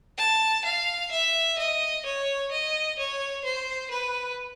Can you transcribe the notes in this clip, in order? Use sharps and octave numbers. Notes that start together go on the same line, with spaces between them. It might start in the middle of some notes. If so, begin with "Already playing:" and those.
A5
F5
E5
D#5
C#5
D#5
C#5
C5
B4